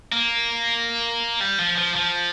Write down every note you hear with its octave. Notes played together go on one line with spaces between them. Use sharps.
A#3
G3
F3
F3
F3